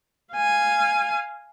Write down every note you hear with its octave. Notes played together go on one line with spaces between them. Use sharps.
F5 G#5